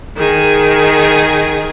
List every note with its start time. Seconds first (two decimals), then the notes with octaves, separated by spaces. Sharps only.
0.17 D#3 G#4